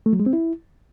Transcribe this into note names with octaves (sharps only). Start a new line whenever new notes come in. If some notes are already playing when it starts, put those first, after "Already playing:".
A3
F#3
G#3
C4
E4